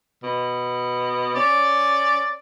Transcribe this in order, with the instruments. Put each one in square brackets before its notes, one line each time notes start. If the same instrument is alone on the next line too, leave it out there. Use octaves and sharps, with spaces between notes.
[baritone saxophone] B2
[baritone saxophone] C#4 [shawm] D5